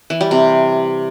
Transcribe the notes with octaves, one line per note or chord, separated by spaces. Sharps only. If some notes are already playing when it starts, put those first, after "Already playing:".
E3
G3
C3